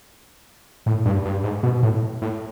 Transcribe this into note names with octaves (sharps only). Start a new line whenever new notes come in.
A2
G2
G2
G#2
B2
A2
A2